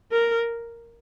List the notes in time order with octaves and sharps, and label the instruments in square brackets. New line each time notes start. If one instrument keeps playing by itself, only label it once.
[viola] A#4